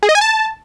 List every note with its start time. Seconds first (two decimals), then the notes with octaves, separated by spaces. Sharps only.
0.03 G#4
0.09 D#5
0.15 G#5
0.21 A5